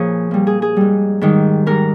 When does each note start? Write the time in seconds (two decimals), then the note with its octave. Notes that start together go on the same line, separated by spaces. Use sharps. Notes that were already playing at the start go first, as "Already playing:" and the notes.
Already playing: A#2 F3 G#4 C#5
0.31 A#2 G3
0.47 G#4
0.62 G#4
0.76 G#2 G3
1.21 G#2 D#3 G3
1.66 G#2 G3 A#4